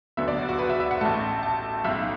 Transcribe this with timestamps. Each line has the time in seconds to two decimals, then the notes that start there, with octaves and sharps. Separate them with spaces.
0.17 D2 D3 F#3 B3 E5
0.28 D5
0.38 F#4
0.49 F#4
0.59 B4
0.69 E5
0.80 E5
0.91 F#5
1.01 A1 A2 A3 A5
1.43 A5
1.84 B1 A2 A3 E5